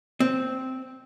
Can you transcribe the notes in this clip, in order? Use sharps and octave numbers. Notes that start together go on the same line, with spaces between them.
C4